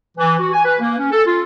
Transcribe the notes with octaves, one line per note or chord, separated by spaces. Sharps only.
E3
F#4
G#5
B4
A#3
C#4
A4
F4